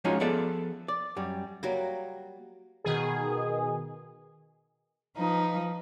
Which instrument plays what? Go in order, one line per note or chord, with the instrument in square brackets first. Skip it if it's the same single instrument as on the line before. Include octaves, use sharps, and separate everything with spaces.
[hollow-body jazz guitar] F3 G#3 C#4 D#4 F4 F#4
F3 B3 G#4 A4 D5 E5
D5
F#2 G3
[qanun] F#3 G3 A#3
[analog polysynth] B2 D#3 G#4
[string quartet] F3 D#4 B4